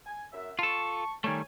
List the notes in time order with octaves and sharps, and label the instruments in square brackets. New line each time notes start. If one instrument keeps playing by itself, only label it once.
[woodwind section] G#5
F#2 E5
[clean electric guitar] F4 A4 [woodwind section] A5 C#6
[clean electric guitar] D#3 G3 A3 [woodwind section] C#5 G#5